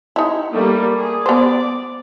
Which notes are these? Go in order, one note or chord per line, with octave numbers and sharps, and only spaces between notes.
D#4 E4
G3 A3 A#3
G#4
B3 C5 D5